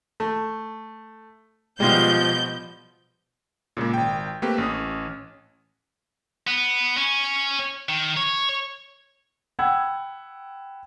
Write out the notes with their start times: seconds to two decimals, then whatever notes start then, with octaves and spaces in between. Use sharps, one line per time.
0.20 A3
1.80 B2 F3 G3 G#3 F4 G6
3.77 A#2 C#3 G#3 A#3
3.94 G#1 G5
4.42 A3 A#3 C4 G4 B4
4.58 A1 C#4 D#6
6.47 B3
6.97 C#4
7.89 D#3
8.17 C#5
9.59 F#5 G5 B5 E6 G#6